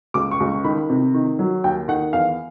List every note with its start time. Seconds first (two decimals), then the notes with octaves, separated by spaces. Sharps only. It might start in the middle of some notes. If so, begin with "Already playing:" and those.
0.14 C#2 D6
0.31 C#6
0.40 C#2
0.48 C#6
0.64 D#3 B5
0.90 C3
1.14 D#3
1.39 F#3
1.64 D#2 G5
1.88 D#3 F#5
2.13 E2 F5